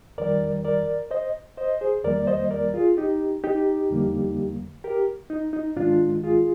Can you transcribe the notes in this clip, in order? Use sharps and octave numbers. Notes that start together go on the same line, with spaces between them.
F2 D#3 G3 A#4 D5
A#4 D5
C5 D#5
C5 D#5
G#4 C5
F2 D#3 G3 A#3 A#4 D5
D5
C5 D#5
A#4 D5
F4 G#4
D#4 G4
D#4 G4
F2 D3 G3 A#3
G4 A#4
D#4
D#4
G#2 D#3 G#3 D4 F4
F4 G#4